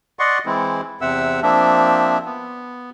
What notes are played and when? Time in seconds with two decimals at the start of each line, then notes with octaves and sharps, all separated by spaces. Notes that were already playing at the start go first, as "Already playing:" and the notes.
0.19 D5 D#5 F#5 C6 C#6
0.46 E3 G#3 C4 E4
1.01 E2 C3 C4 E5 F#5 E6
1.43 F3 A#3 C4 D4 E5
2.25 B3